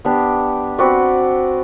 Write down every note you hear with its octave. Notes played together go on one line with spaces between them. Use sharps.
B3 D4 G4
C4 F#4 B4 D5